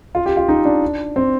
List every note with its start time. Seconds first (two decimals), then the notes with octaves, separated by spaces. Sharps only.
0.15 F4
0.26 G4
0.37 F4
0.49 D#4
0.65 D4
1.16 C4